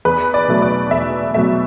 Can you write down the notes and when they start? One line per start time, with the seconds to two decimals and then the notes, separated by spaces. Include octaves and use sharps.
0.05 E2 B4
0.34 D5
0.48 B2 F#3 A3
0.62 D5
0.91 E2 E5
1.34 B2 F#3 A3 E5